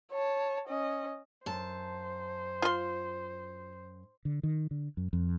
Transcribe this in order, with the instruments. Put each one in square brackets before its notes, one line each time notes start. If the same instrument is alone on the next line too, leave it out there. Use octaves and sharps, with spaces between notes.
[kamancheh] C#5 A5
C#4 D#5
[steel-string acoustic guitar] F#2 A5 [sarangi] C5
[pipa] F4 C6
[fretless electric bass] D3
D#3
D3
F#2
F2